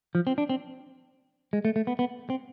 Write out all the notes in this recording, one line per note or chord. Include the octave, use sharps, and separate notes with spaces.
F3
C4
D4
C4
G#3
A3
A3
B3
B3
C4